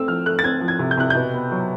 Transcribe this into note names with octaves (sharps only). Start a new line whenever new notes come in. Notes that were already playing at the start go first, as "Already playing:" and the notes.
Already playing: A3 C4 E6
F3 F6
A3 F#6
A6
C4 G#6
F3
G#6
C3
G6
C3 F#6
B2 G6
B3
F#3